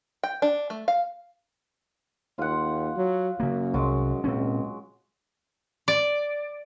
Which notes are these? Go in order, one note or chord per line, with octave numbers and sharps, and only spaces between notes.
G5
D4
A3
F5
D#2 F4 F#5
F#3
F#2 C#3 A#3
C2 F#3 G#3
C#2 A#2 C4 C#4
D5